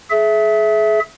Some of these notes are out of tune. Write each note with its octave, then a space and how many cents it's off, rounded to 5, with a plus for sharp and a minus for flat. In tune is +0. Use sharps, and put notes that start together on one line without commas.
G#4 +35 E5 +0